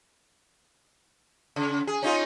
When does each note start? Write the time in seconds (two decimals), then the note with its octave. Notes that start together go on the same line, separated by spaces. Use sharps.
1.56 C#3
1.87 G#4
2.03 C#4 D#4 F4